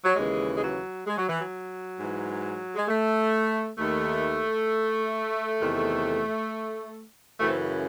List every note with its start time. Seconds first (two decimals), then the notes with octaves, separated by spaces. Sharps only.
0.04 F#3
0.16 D#2 C#3 E3 G#3
0.55 G#3
0.62 F#3
1.07 G#3
1.18 F#3
1.29 E3
1.40 F#3
1.97 G#2 E3
2.76 G#3
2.88 A3
3.78 D#2 D#3 A3
5.60 E2 C3 D#3
7.40 F#2 C#3 E3 A3
7.49 C4
7.58 A3